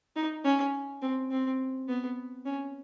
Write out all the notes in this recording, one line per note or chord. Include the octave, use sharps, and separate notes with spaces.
D#4
C#4
C4
C4
B3
C#4